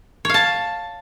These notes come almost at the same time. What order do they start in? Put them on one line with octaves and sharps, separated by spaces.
C#5 F5 A5